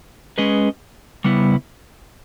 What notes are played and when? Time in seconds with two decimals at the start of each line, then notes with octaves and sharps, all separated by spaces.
0.38 G#3 C#4 G#4 B4 D#5
1.24 C#3 G3 B3 E4